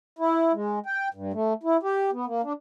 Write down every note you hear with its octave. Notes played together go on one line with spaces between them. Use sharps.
E4
G#3
G5
G2
A3
E4
G4
B3
A#3
D4